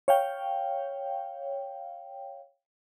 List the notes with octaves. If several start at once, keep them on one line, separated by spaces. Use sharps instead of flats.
C#5 F5 G5